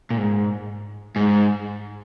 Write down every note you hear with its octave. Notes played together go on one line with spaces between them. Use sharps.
A#2
G#2
G#2